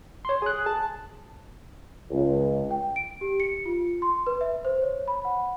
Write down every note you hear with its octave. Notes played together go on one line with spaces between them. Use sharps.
C#5 C6
G#4 G#5 F#6
A5
C#2
G5
D7
G4
C#7
F4
C6
B4
E5
C5
C#5
B5
F#5